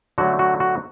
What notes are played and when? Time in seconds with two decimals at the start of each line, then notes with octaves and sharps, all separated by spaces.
0.18 D3 F#3 A3 F#4
0.39 F#4
0.60 F#4